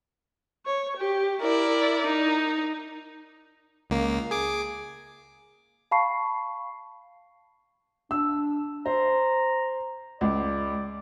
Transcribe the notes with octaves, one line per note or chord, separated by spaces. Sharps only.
C#5
G4
E4 A#4 D5
D#4
C#2 A#3
G#4 D6
F5 A5 B5 C#6 C7
D4 E6
C5 A#5
C#2 D5